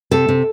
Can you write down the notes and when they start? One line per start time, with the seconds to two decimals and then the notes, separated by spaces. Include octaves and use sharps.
0.11 C3 A4
0.28 C3